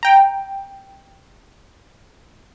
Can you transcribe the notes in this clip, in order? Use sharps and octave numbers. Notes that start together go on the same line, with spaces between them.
G5 A#5